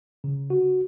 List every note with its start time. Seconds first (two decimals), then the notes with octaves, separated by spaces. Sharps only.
0.24 C#3
0.50 F#4